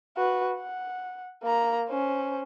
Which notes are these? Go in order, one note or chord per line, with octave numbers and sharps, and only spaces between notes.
F#4 B4
F#5
A#3 A#5
C#4 C5